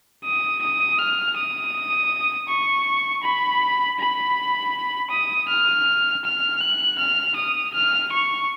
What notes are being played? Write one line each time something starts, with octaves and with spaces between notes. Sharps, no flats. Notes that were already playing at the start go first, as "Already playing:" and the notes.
D#6
D#6
F6
D#6
C#6
B5
B5
D#6
F6
F6
F#6
F6
D#6
F6
C#6